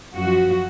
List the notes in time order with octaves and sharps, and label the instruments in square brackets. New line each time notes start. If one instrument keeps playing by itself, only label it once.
[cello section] F#2 F3 F#4